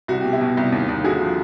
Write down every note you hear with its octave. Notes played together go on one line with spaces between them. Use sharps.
C2 F#4
B2 G4
E4 F#4
B2
C2
D#2
D#2
D3 F#4 G#4
F3